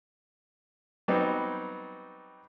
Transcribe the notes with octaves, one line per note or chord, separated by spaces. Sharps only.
F#3 G3 B3 C4 D#4